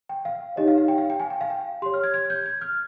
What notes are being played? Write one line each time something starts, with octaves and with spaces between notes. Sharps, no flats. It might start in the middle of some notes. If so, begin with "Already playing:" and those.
G5
F5
D#4 G4 C#5 D#5
F5
F5
G5
F5
G5
G#5
G5
F5
G5
G4 C#5 C6
F6
G#6
G#6
G6
G#6
F6